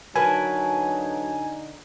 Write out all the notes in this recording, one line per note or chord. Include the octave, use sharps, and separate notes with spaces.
D3 F#3 D#4 A#4 B4 G#5 A5